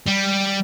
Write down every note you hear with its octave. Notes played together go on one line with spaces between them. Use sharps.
G3